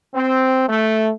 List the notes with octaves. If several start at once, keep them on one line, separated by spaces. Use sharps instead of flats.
C4
A3